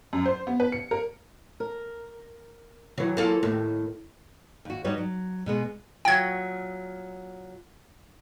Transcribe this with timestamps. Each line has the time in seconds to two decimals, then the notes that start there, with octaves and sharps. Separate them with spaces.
0.13 F#2
0.26 C5
0.47 B3
0.60 B4
0.72 C#7
0.91 A#4
1.60 A#4
2.98 D#3 E3 F#3
3.17 A#3 F4 A4
3.43 D#2 A2 D#3
4.65 D#2 F#4
4.84 G3 D#4 F#4 B4 C#5
4.98 F#3
5.46 B2 G#3 B3
6.05 A#2 F#3 G5 G#6